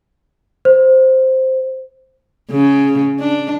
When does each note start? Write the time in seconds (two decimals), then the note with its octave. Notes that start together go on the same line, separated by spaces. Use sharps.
0.65 C5
2.51 C#3
3.20 D4